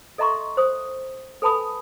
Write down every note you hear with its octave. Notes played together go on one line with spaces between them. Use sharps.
A4 D#5 E5 A#5 C6 C#6
C5 D#6
A4 B4 G#5 A5 B5 D#6